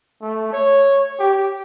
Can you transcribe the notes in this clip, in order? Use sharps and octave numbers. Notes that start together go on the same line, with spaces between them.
A3
C#5
G4